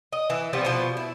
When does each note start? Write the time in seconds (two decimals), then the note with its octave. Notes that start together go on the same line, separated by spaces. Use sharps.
0.13 D#5
0.30 E3
0.53 F3 G3 B3 C4
0.65 B2 F3
0.97 E4